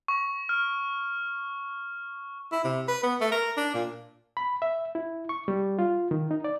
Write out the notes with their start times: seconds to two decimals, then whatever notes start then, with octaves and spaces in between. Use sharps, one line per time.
0.08 C#6
0.49 F6
2.52 E4
2.64 C3
2.88 B4
3.03 B3
3.21 A3
3.32 A#4
3.57 D4
3.74 A#2
4.37 B5
4.62 E5
4.95 E4
5.29 C#6
5.48 G3
5.79 F4
6.11 D#3
6.31 D#4
6.44 D5